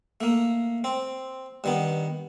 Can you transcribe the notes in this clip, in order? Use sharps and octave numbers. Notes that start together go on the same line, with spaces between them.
A3 A#3
C4
G2 D#3 B3